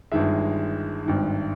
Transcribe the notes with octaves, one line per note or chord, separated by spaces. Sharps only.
G1 G2 D#3 G#3 E5
G#1 G2 D#3